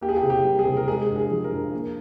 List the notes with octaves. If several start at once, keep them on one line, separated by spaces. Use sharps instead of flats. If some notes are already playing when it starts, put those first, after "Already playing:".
A#3 G4
G#4
G4
C3
G4
G3
G#4
C3
A#4
G#3 G#4
G2
G#4
F3
A#4
G2
A#3